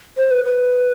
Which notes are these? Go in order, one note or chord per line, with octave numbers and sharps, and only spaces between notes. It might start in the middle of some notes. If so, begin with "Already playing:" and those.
C5
B4
B4